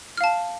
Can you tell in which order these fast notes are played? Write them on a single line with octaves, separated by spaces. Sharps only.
F6 F5 A5